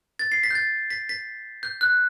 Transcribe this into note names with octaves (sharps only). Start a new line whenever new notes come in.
A6
C7
B6
G6
A6
B6
B6
G6
F#6